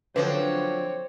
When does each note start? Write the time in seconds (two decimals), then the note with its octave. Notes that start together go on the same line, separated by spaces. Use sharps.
0.16 D3 F3 F#3 C4 B4 C#5